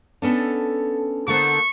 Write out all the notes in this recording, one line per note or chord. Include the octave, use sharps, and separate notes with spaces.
B3 C#4 D4 A4
D3 A#3 B3 A4 C5 C#6